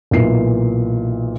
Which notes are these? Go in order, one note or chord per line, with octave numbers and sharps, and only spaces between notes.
B1 A#2 E3 C7